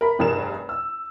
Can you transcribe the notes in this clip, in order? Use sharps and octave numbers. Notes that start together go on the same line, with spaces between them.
A#4 B5
F1 G2 G#4 A#4 E7
E6